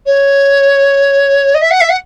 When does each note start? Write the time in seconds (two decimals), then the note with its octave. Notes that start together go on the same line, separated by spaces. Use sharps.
0.06 C#5
1.54 D#5
1.61 E5
1.71 F#5
1.81 E5
1.89 F#5